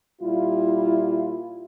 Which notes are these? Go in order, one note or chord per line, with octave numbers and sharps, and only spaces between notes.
A#2 G3 E4 F4